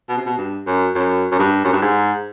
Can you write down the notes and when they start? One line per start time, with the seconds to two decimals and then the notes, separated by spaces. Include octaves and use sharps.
0.09 B2
0.17 C3
0.26 B2
0.38 G2
0.67 F#2
0.95 F#2
1.32 F#2
1.39 G2
1.65 F#2
1.73 G2
1.82 G#2